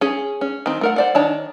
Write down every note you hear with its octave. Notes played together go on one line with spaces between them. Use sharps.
C#4 G#4
C#4
D#3 C4
A3 A#4 F#5
C5 D5 F#5
D#3 D4 C#5 A5